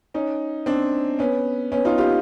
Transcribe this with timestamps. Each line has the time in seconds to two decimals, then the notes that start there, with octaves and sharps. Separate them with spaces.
0.14 C#4 D#4
0.66 C4 D4
1.19 B3 C#4
1.72 B3 C#4
1.85 D#4 F4
1.98 F4 G4